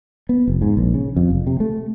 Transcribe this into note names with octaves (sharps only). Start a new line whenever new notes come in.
B3
F1
G#2
A#1
C#3
F2
F1
C3
A3